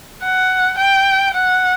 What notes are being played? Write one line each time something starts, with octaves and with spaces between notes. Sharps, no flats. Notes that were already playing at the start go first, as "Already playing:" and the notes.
F#5
G5
F#5